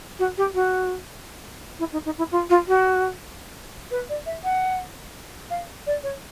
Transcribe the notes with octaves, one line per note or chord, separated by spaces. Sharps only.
F#4
G4
F#4
E4
D#4
D#4
E4
F4
F4
F#4
B4
D5
E5
F#5
F5
D5
C#5